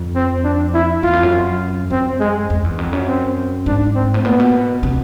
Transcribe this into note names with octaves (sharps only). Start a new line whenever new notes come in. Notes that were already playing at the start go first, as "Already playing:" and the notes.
Already playing: F2
C4
D4
E4
E2 F4
F2
F#2
F#2 C4
G#3
F2
E2
F2
F#2
C4
G#2 D4
C4
A2
A#2 B3
B2
C3